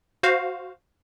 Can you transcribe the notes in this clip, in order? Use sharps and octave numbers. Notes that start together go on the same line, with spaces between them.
F#4 C5 F5